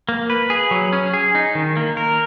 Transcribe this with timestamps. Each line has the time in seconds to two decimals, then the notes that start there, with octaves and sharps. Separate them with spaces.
0.09 A#3
0.30 B4
0.50 G#4
0.71 F#3
0.93 C#4
1.14 G#4
1.35 D#4
1.55 D#3
1.77 A#3
1.97 A#4